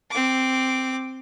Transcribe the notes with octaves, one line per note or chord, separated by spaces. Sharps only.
C4 D6